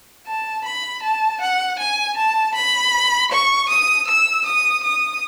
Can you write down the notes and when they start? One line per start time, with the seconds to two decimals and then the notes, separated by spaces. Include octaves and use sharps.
0.27 A5
0.65 B5
1.03 A5
1.41 F#5
1.79 G#5
2.17 A5
2.55 B5
3.32 C#6
3.69 D#6
4.08 E6
4.46 D#6
4.84 D#6